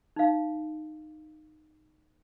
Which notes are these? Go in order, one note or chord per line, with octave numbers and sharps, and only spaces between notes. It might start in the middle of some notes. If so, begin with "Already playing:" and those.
D#4 F5